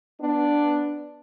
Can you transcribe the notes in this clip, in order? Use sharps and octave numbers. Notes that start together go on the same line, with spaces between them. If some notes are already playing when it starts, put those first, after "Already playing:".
B3 D4